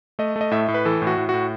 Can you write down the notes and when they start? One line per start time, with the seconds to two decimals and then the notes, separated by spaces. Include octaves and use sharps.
0.19 A3 D#5
0.36 A3
0.41 D#5
0.51 A2 E5
0.68 A2
0.74 B4
0.85 E3 A4
1.02 A2
1.07 F#4
1.17 A2
1.29 A2 F#4